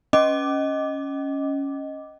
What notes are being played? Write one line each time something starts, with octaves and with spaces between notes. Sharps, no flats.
C#4 D#5 D6